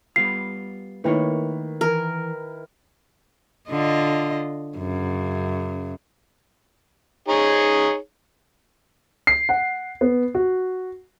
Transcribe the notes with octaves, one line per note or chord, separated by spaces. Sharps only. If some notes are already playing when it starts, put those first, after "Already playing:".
G3 B3 F4 C7
D#3 A3 A#3 E4 B4 C#5
E3 A#4
D3 F4 D#5
F#2 C#3
D#4 G#4 C#5
C7
F#5
B3
F#4